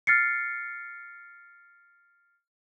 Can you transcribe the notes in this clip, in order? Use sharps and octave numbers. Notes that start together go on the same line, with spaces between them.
F6 A6 C7 C#7